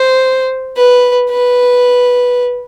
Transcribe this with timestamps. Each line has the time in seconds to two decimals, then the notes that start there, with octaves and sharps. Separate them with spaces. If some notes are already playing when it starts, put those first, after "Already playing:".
Already playing: C5
0.76 B4
1.30 B4